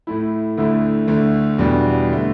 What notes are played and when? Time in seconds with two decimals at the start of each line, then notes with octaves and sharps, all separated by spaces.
0.07 A2 A3 E4
0.57 D2 D3 A3 E4
1.08 D2 D3 A3
1.58 E2 B2 G3 D4
2.11 D3 A3